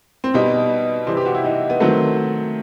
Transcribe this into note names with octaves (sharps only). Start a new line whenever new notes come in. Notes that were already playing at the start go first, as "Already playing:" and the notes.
C4
B2 G3 D#4
C3 E3 G3 C4
G4
F#4
E4
D#4
B3
D#3 F#3 A3 C4